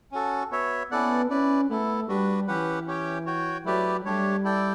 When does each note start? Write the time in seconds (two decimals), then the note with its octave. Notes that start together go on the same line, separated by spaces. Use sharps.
0.12 C#4 F#4 A4
0.51 B3 F#4 C#5 E5
0.91 B3 C#4 E4 A4 D5 F#5
1.30 C#4 E4 B4 D5
1.70 A3 B3 E4 A4
2.08 G3 D4 F#4 B4
2.47 E3 C#4 G4 B4 F#5
2.87 C#4 G4 C#5 G5
3.26 F#4 C#5 G5
3.65 F#3 A3 E4 G4 B4 D5
4.05 G3 A3 D4 G4 C#5
4.44 E4 A4 D5 G5